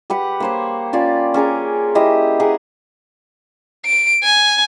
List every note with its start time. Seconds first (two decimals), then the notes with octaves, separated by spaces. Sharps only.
0.10 G4 B4 F#5
0.40 A#3 C5 C#5
0.93 C#4 F4 D5
1.34 C#4 G#4 A#4 D6
1.95 E4 G4 C5 D#5
2.40 G#4 A#4 B4 F#5
3.86 D7
4.23 G#5